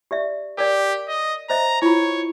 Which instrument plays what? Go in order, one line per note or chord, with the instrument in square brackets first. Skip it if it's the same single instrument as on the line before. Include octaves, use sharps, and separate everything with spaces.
[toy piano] G4 D5 E5
[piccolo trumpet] G4 [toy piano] A#4 D5
[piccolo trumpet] D#5
[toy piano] C5 D#5 E5 [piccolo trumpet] A#5
[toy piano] E4 F4 [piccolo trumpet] C#5